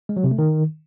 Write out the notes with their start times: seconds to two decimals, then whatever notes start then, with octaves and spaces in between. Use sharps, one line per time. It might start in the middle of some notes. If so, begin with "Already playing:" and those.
0.09 G#3
0.17 F#3
0.24 C3
0.31 A3
0.38 D#3